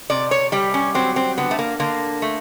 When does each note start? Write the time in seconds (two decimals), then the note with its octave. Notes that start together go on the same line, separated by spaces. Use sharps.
0.10 C3 D5
0.31 C#5
0.52 G3 G4
0.74 C#4
0.95 F#3 C4
1.16 C4
1.38 D3 B3
1.51 A3
1.59 A#3
1.80 D3 A#3
2.22 A3